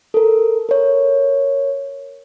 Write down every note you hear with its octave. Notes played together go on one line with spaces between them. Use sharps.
A4 A#4
A#4 C#5